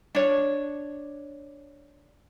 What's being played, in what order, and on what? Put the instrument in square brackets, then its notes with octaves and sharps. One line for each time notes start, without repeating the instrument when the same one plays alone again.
[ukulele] D4 C#5